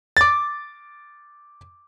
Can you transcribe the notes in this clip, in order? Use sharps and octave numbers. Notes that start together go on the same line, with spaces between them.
D6 A6